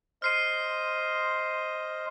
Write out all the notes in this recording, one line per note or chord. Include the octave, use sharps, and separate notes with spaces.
C5 D#5 F6 C7 D#7